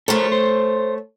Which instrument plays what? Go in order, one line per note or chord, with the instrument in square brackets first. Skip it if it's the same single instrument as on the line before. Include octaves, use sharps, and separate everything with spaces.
[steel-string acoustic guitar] A3 C#5 [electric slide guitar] A4 A#4 C5
[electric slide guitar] C5